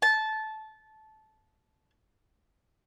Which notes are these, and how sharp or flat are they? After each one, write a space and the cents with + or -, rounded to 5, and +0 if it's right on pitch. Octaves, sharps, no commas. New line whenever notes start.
A5 -15